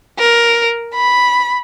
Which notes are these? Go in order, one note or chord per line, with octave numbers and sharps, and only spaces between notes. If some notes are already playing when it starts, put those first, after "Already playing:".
A#4
B5